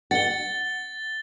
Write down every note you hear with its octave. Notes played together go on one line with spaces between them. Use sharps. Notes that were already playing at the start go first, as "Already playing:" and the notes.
F#5 A6 G7